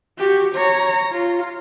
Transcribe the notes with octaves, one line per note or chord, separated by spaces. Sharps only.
F#4 G4
C#5 A#5
F4